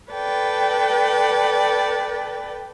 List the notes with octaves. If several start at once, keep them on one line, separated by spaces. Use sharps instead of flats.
A4 B4 D5 G5